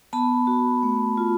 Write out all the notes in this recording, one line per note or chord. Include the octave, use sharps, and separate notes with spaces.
B3 A5 B5
F#4
A3
F4